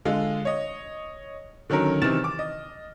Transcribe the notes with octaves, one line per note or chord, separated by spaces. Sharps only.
D3 G#3 F4 G#4
C#5 D#5
D3 D#3 F#3 C#4 A#4
C3 D#3 E3 F6 A6 E7
D6
D#5